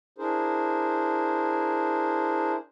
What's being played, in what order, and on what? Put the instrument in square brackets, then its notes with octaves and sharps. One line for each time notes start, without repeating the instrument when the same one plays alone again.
[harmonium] D4 E4 G#4 A#4 C5